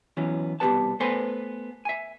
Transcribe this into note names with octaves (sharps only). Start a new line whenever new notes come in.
E3 F#3 B3 C#4
C2 B2 A3 G4 B4 A5
A3 B3 A4 B4 C5 G#5
E5 G#5